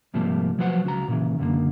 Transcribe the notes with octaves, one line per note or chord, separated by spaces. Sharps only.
G#2 C3 F3 G3 A3 A#3
F3 F#3 F#4 B4 C5 F#5
C#2 F#4 A#5
A#2 C#3 E3
C#2 F#2 D3 A#3